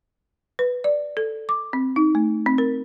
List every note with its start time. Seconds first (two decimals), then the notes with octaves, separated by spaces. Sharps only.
0.59 B4
0.84 D5
1.17 A4
1.49 D6
1.73 C4
1.96 D#4
2.15 A3
2.46 C4
2.58 A#4